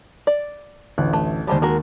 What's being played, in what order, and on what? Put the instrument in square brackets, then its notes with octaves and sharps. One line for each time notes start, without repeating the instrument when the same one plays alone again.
[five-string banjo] D5
[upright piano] A1 D2 F#6
[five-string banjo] A3
[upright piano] D#2 A5 [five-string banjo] G3 G#3 C5
[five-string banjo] G#3 F#4 A#4